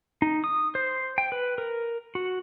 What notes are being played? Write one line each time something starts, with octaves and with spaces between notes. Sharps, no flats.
D#4
D#6
C5
G5
B4
A#4
F#4